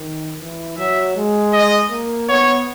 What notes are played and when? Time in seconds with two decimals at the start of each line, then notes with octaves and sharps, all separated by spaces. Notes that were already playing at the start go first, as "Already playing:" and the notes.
Already playing: D#3
0.40 E3
0.78 F#3 E5
1.16 G#3
1.53 D#5
1.91 A#3
2.29 B3 C#5